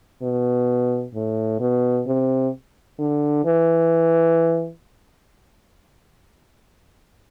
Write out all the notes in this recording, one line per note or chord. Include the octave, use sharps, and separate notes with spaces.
B2
A2
B2
C3
D3
E3